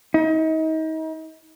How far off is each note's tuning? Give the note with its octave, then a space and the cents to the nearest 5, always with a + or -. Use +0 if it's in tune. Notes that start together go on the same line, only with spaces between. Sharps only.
D#4 +35